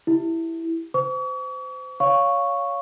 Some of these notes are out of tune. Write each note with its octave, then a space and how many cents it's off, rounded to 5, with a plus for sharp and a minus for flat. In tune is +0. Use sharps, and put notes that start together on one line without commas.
E4 +0 G4 +0
C5 -30 C#6 +40
C#5 +20 F5 +10 C#6 +0